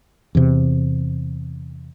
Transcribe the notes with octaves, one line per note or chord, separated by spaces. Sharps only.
E2 C3